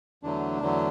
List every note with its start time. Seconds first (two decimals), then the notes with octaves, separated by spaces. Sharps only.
0.23 E2 D3 F#3 A3 D4
0.61 E2 D3 F#3 A3